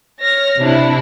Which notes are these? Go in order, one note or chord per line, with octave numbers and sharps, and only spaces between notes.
C#5 F6 A#6
C3 D4 E4